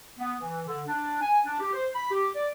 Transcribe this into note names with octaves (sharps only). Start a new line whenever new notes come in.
B3
E3
D3
D4
G#5
D4
G4
C5
B5
G4
D5